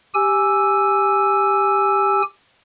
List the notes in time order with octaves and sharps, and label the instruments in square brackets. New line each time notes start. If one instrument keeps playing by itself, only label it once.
[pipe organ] G4 G#5 E6